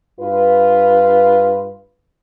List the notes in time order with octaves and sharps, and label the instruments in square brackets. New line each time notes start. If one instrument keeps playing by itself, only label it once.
[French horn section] G2 F4 B4